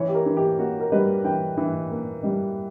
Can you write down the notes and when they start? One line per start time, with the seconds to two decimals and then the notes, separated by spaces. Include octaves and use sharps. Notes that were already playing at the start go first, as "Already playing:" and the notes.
Already playing: E3 C#5
0.08 G4
0.15 A#4
0.26 E3
0.37 G4
0.58 A#3 F#4
0.80 A#4
0.92 G3 B4
1.24 E3 G5
1.57 E3
1.90 A#3
2.23 G3